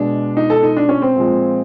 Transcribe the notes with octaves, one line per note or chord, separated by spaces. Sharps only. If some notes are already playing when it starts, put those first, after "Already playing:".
Already playing: B2 G#3 D4
D#4
A4
D#4
D4
C#4
C4
A#2 F3 G#3